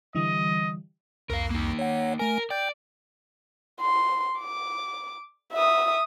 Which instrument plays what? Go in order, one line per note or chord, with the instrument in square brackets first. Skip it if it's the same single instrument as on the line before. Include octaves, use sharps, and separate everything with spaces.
[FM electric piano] D3 E3 G3 [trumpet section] D#5
[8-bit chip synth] C2 F2 [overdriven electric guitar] A#4 F5
[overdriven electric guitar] A#3 D#4
[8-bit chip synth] C#5 F#5
[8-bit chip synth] A3 G#5 [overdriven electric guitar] A#4
[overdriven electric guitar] D5 [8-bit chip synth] G5 G6
[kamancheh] C6
D6
E5 D#6